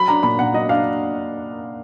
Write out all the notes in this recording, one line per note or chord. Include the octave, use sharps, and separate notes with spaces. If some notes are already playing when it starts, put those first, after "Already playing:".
Already playing: F#3 B5
D4 A#5
A#2 B5
A#2 F#5
F#3 D#5
D4 F5